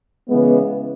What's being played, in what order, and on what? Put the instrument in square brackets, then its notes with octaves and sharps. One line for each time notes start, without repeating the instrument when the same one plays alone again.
[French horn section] C#3 E3 G#3 B3